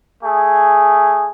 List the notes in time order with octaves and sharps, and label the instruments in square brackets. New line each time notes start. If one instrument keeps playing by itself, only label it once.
[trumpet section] A3 G#4